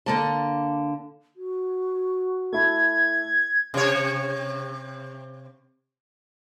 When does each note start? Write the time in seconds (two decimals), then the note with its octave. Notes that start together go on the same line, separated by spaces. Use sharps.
0.06 D3 A#3 A5
1.36 F#4
2.53 A3 E4 G#6
3.74 C3 C#5